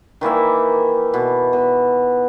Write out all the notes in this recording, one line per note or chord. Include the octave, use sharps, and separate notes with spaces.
D#3 E3 A#3 E5
B2
B2